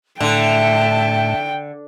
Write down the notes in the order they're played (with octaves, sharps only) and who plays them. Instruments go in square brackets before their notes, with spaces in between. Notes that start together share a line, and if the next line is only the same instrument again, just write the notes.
[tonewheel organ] A2 [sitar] D3 [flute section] E5 A5 [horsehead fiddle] G5